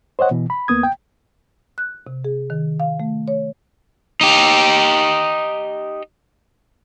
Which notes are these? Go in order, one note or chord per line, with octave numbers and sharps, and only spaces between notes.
C5 C#5 D#5 F#5
B2 E3
B5
D#2 A#3 B3 D#6 G#6
G5
F#6
C3
G#4
D#3
F5
A3
C#5
D#4 G4